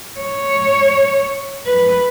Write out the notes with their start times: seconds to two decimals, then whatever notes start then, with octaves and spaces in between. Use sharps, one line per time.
0.20 C#5
1.66 B4